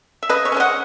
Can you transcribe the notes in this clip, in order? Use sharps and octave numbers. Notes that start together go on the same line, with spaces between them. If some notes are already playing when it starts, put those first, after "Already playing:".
E5
C#3 B4 D#5
C#5 E5
E3 G#3 C#4
D#5 F#5